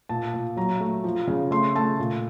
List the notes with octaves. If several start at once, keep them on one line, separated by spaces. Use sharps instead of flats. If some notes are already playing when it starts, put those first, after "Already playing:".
A#2 A5
A#2
F#3 A#5
A3
F3
C#3
A3 C6
A3 A5
A#2